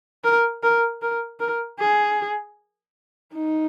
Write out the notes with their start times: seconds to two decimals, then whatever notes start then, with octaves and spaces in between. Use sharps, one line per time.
0.24 A#4
0.63 A#4
1.02 A#4
1.40 A#4
1.79 G#4
3.34 D#4